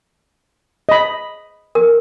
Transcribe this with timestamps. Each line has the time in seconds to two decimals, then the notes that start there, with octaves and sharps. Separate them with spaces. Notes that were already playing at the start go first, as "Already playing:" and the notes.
0.89 D#5 B5
1.75 A#4